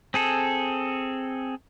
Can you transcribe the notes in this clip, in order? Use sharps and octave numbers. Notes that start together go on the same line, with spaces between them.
C4 G#4 A4